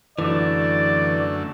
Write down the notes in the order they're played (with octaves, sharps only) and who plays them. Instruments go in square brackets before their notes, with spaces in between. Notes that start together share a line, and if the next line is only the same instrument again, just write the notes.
[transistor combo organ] F#2 D3 A3 [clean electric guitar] E3 [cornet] D5